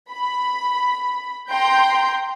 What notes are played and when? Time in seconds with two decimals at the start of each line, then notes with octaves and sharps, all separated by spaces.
0.11 B5
1.49 G5 A#5 C6 G6